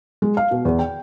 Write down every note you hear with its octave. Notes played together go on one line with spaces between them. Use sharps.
G#3
F5
B2
E2
G5